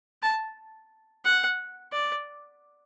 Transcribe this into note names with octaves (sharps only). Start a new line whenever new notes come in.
A5
F#5
D5